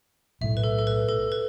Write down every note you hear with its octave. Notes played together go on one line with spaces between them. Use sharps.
B1 A2 A3 E5
B4
A4
A4
B4
A4
B4